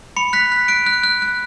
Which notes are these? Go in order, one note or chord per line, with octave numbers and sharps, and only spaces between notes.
B5 C#7
F#6 B6
F#6
F#6 D7
F#6
F#6
F#6